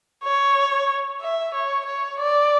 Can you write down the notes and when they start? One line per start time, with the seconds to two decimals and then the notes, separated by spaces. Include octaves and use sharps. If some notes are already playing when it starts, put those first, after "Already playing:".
0.24 C#5
1.22 E5
1.54 C#5
1.86 C#5
2.19 D5